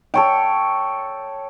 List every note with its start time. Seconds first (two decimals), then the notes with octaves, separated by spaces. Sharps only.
0.14 A4 C#5 G5